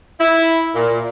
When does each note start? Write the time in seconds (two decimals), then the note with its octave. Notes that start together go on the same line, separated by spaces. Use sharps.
0.20 E4
0.76 A#2